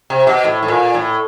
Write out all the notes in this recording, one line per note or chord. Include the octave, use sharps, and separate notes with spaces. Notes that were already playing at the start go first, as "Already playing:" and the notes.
C3
B2
A2
A2
A#2
A2